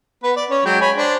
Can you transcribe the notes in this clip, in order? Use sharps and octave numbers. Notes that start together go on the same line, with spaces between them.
B3 B4
D5
C#4 C#5
F#3 G#3 G5
C#5 G#5 B5
D4 C5 D5